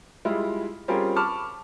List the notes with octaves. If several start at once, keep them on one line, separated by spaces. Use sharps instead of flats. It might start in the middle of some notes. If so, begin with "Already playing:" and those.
G3 G#3 E4 F4
G3 C4 C#4 F4 G#4 A#4
A5 B5 C#6 D6 F6